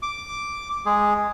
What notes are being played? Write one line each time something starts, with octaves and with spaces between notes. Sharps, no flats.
D6
G#3 G#4